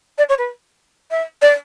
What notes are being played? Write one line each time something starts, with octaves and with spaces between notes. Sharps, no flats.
D5
C#5
B4
E5
D5